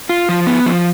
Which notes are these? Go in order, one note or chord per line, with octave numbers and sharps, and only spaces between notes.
F4
F3
B3
F3